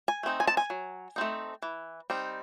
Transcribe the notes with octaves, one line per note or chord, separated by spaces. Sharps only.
G#5
A3 C4 D#4
G#5
A5
G#5
F#3
A3 C4 D#4
E3
G3 C4 D#4